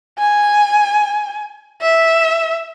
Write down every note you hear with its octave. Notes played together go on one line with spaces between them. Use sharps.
G#5
E5